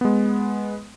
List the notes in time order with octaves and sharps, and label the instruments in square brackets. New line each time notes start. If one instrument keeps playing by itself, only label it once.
[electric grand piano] G#3 B3